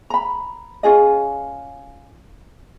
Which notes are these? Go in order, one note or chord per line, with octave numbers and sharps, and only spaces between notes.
A#5 B5
C#4 F4 G#4 D#5